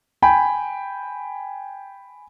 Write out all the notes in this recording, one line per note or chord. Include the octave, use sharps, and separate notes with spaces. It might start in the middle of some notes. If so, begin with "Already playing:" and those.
G5 G#5 B5